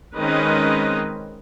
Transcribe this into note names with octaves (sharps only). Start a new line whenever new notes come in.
D#3 G#3 C4 C#4 B4 D#5